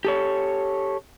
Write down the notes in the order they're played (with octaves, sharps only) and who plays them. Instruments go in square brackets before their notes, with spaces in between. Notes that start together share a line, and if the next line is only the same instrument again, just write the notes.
[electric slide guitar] G4 A4 C#5